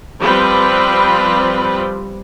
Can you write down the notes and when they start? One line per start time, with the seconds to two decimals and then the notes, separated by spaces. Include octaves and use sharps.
0.20 F3 G3 C4 B4